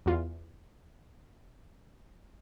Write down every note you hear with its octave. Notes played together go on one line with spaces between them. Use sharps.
E2 F4